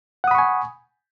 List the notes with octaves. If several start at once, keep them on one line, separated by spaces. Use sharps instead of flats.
F#5 G#5 B5 C#6 D#6